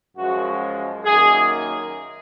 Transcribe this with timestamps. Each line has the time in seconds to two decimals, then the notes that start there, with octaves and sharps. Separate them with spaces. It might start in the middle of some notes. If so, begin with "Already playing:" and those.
0.16 F#2 F3 G#3 F#4
1.03 F#2 D#3 A#3 G#4